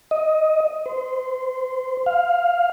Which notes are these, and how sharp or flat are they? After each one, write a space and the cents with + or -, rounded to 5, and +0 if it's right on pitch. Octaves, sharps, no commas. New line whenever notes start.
D#5 +10
C5 -25
F5 +10